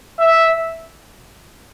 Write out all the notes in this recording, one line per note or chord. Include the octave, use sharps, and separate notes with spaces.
E5